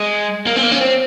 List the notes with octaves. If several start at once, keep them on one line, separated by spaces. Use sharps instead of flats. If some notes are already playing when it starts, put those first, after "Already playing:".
Already playing: G#3
A#3
C4
A#3
C#4
C4